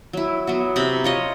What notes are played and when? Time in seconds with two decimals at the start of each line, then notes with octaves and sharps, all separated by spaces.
0.13 F#3 E4
0.47 F#3 B3 F#4
0.76 C3 A#5 B5
1.04 F4 C#5 D#5